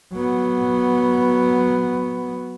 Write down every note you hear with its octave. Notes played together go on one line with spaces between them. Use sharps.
F#3 B3